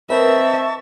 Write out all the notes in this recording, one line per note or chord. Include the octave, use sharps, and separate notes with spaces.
C4 A#4 B4 D#5 E5 A5 C#6